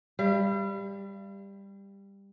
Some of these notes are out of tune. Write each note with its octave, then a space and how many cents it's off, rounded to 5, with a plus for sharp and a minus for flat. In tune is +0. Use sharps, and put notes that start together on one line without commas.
G3 +15 F5 -40